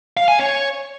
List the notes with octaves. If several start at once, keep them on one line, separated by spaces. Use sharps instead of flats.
F5
G#5
C#5